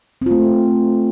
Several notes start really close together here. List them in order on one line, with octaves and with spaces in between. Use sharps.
C4 F4 A3